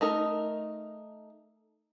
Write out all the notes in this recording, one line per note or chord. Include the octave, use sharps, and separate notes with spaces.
A3 D#4 A#4